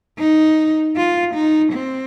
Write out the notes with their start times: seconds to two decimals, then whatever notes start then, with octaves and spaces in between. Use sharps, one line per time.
0.18 D#4
0.96 F4
1.35 D#4
1.73 C4